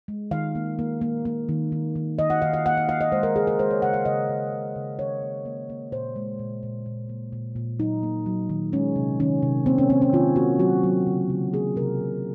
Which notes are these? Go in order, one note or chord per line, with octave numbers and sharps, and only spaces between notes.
G#3
D#3 F5
A#3
A#3
A#3
A#3
D#3
D#3
D#3
D#3 D#5
F#5
D#3 F5
F5
A#3 F#5
F5
A#3 F5
D#5
G#3 C5
A#4
C#3 G#4
A#4
G#3 C5
C#5
C#3 F#5
F5
C#3 D#5
C#3
C#3
C#3
D#3 C#5
A#3
A#3
A#3
A#2 C5
G#3
A#2
A#2
A#2
A#3
A#2
A#2
F#3 D#4
A#3
F#3
D#3
G#3 C#4
C3
D#3 C#4
C3
A#3 C4
C#4
A#3 C4
C#4
D#3 F4
A#3 F#4
F#3 F#4
F#3
C#3
C#3
A#3 G#4
C3 A#4
C3